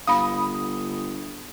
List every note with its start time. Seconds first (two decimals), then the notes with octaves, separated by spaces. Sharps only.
0.07 G1 F5 B5 D#6